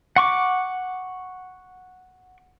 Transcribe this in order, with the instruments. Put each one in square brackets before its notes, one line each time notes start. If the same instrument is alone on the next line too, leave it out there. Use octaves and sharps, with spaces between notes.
[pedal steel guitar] F#5 C#6 D6